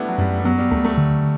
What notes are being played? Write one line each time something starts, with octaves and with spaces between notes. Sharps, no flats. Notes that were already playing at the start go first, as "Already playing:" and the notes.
Already playing: G3 A3 B3 D4 E4
F#3
F#2 G3
G3
F#3 B3
G3
D2 A3
A3
D3